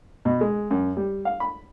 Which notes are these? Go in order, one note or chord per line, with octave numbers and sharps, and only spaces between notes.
B2
G#3
F#2
G3
F5
B5